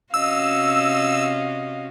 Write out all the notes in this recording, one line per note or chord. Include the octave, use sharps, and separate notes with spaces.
C3 C#4 F#4 D#5 F5 E6